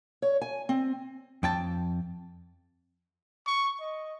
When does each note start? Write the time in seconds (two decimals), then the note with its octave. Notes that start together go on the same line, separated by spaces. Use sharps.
0.22 C#5
0.41 G#5
0.69 C4
1.43 F2 G5 A5
3.47 C#6
3.80 D#5